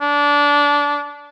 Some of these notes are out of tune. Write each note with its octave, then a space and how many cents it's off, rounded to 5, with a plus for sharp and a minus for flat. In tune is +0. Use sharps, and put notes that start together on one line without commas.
D4 -20